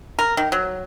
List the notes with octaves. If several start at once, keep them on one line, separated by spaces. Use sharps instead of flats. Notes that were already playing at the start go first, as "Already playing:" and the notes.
A#4
D#3
F#3